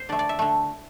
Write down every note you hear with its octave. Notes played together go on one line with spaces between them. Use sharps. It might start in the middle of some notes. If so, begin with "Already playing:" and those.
Already playing: C5
D3 A3 D5
D5
E5
D3 A3